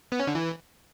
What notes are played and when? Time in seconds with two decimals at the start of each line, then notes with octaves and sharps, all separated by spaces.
0.12 B3
0.20 C#4
0.27 D3
0.35 E3